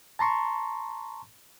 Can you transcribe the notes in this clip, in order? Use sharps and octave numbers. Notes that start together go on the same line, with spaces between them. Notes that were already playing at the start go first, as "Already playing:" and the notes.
A5 A#5 C6 C#6